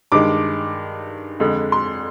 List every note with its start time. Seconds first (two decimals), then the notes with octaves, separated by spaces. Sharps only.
0.12 G2 D#3 G#3 D6
1.40 F2 D3 G#3
1.72 C6